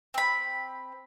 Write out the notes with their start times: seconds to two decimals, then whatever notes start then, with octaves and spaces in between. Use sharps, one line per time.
0.14 C4 B5